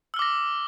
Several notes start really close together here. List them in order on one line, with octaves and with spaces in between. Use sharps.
E6 F6 D6 A#6